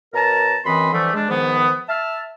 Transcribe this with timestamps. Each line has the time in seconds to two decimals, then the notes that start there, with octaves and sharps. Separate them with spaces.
0.14 B2 A#4 C#5 A5 A#5
0.65 F#2 E3 C4 D#5 B5 C6
0.92 D3 E3 F3 G3 A3
1.14 G#3 D4
1.29 G#2 D#3 F3 B3
1.88 E5 A5 F6